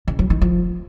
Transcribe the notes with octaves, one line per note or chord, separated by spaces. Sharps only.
C#3
F#3
D#3
F3